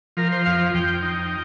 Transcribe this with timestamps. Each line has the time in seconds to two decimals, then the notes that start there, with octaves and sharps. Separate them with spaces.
0.17 F3 A#4
0.32 C5
0.46 F2 F5
0.74 F2 G5
1.02 D#4